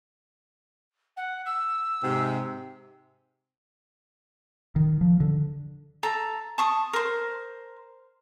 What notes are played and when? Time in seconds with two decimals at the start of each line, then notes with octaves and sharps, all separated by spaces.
1.16 F#5
1.45 E6
2.02 G#2 C3
4.76 D#3
5.01 F3
5.20 D3
6.03 A4 A#5
6.58 A5 C#6 D#6
6.93 A#4 C5